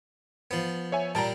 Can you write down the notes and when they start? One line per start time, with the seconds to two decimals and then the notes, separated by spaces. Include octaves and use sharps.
0.51 F3 B3
0.92 C#5 E5 G#5
1.15 A#2 G3 A5 A#5